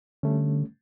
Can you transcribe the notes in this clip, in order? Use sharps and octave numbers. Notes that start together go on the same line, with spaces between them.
D3 G3 A3 C#4